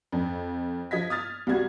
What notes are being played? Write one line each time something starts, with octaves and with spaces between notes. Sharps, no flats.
F2
F3 D#5 G#6 B6
D#6 F6 A6
C2 G2 G3 F#4 G#6